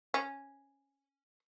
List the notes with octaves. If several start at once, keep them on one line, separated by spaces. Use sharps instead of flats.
C#4